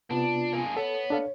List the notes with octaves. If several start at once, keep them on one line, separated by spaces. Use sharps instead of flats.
C3 B3 D4 F4
A#3 G#4
B3 A4 C#5
D4 A4 F5